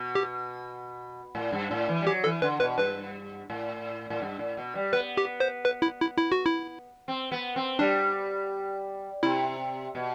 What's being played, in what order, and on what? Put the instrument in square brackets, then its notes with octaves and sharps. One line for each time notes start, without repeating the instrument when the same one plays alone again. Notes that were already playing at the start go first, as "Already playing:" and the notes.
Already playing: [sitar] B2
[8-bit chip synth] G4
[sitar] A2
G2
A2
E3
G3
[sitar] F#3 [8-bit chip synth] G4
[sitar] E3 [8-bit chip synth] A4
[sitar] D3 [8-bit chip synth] B4
[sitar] B2 [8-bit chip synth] B4
[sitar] G2 [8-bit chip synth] B4
[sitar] A2
A2
G2
A2
B2
G3
[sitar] B3 [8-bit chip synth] B4
[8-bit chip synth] G4
C5
B4
E4
E4
E4
F#4
E4
[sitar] C4
B3
C4
[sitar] G3 [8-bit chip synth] D4
[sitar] C3 [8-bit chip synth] E4
[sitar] B2